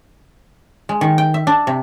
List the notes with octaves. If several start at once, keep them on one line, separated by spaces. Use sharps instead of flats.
G#3
D#3
G5
E5
D4
C3